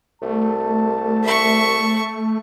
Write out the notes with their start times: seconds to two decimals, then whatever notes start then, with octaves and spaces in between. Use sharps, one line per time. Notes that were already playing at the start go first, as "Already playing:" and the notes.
0.22 C2 A3 A5
1.23 E5 C#6